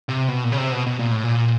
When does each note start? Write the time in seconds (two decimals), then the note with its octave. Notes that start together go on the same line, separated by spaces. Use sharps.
0.09 C3
0.28 B2
0.43 A#2
0.52 C#3
0.58 C3
0.72 B2
0.87 B2
0.99 A#2
1.12 A2
1.24 A#2